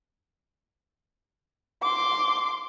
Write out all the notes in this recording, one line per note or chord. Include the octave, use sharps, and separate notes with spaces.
C6 D6